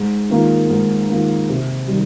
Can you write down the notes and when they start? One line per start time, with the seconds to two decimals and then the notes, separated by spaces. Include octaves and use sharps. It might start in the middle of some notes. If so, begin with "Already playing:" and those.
Already playing: G#2
0.30 D#3 A#3 F4
0.70 G#2
1.10 D#3 A#3 F4
1.49 C3
1.87 D#3 G3